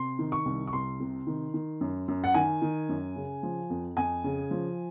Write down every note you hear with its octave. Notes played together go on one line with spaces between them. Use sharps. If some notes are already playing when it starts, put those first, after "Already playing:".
Already playing: C3 C6
D#3
C#6
C2
C#6
C2 C6
C3
D#3
D#3
F#2
F#2
F#5
D#3 G#5
D#3
F#2
C#3
F3
F2
F2 G#5
C#3
F3